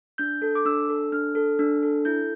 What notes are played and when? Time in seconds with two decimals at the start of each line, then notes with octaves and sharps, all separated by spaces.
0.18 D4 G6
0.42 A4
0.55 D6
0.65 D4 E6
0.89 A4
1.12 D4 F6
1.35 A4
1.59 D4
1.83 A4
2.05 E4 G6